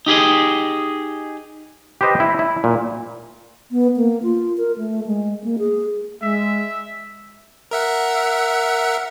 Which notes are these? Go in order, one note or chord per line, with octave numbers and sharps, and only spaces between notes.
D#4 G4 G#4 D#5
G4 B4 C5 D#5
E4
E4
A#2
B3
A#3
F4
A#4
A3
G#3
A#3
G#4
G#3 E5
A#4 E5 F#5